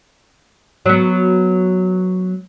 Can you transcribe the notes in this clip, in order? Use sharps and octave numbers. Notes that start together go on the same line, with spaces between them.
F#3 B3